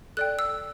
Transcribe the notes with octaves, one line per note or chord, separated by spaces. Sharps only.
A4 D5 G5 F#6
E6